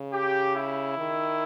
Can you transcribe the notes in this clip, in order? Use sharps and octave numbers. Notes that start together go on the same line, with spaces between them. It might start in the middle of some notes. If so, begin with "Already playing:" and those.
Already playing: C#3
G4
E4
D#3